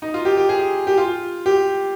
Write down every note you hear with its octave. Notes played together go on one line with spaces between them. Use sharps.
D#4
F4
G4
G4
G#4
G4
F4
G4